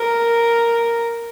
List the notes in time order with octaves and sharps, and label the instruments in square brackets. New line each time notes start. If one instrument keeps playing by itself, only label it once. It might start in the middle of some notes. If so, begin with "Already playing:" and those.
Already playing: [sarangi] A#4